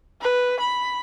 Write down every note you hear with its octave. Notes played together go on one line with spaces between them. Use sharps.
B4
B5